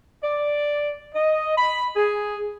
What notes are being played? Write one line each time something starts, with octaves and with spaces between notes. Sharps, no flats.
D5
D#5
B5
G#4